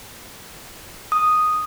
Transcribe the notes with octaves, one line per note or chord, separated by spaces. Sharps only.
D#6